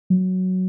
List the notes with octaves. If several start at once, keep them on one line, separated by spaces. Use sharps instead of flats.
F#3